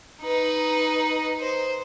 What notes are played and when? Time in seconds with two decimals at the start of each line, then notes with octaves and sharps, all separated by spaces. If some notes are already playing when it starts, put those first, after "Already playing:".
0.22 D#4 B4
1.40 C5